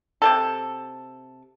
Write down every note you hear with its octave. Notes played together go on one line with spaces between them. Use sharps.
C3 F#3 A4